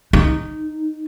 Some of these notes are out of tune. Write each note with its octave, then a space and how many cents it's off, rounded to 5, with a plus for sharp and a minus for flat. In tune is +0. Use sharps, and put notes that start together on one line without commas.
D#4 -10